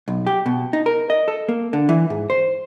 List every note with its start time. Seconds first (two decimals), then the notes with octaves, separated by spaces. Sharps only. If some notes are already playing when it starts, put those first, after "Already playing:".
0.08 B1
0.27 G4
0.46 B2
0.73 D#4
0.86 A#4
1.10 D#5
1.28 A4
1.48 A#3
1.73 D3
1.89 E3
2.10 G#2
2.30 C5